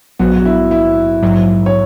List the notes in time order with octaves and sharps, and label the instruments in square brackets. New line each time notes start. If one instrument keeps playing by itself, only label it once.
[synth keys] A#1 G#2 F#3 B3 [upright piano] F#4
[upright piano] F#4
E4
E4
[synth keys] A#1 G#2 F#3
[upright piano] C#5